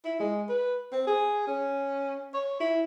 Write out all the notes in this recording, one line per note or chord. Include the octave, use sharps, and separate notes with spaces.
E4
G#3
B4
C4
G#4
C#4
C#5
E4